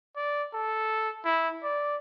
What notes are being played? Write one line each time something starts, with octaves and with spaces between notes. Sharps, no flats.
D5
A4
E4
D5